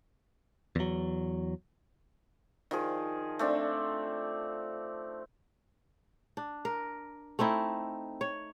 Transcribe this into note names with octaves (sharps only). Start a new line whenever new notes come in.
E2 F#3
D#3 F3 G#4
A3 C4 D4
D4
A#4
A3 C4 D#4 E4
C#5